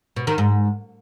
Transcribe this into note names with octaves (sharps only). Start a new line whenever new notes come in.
B2
D#3
G#2